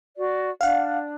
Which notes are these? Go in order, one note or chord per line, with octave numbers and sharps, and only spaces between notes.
F#4 D5
D4 D5 F5 F#5